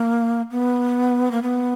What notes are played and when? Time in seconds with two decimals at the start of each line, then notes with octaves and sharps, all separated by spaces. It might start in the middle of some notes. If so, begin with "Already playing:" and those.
Already playing: A#3
0.51 B3
1.31 A#3
1.42 B3